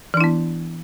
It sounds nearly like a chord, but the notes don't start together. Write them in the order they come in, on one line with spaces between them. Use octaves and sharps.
E3 D4 E4 B3